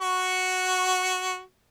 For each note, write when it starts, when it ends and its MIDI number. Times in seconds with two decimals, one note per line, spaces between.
0.02 1.41 66
0.02 1.41 85